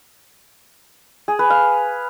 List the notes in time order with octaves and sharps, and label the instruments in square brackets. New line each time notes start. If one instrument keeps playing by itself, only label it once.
[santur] G#4
B4
F5